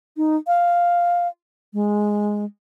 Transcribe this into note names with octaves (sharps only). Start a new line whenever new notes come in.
D#4
F5
G#3